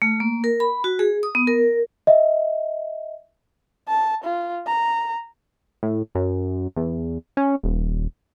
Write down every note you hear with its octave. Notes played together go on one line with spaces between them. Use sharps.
A3
A#3
A#4
B5
F#4
G#4
D#6
B3
A#4
D#5 E5
A5
F4
A#5
A2
F#2
E2
C#4
D#1